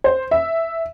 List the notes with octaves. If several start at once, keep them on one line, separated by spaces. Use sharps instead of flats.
C5
E5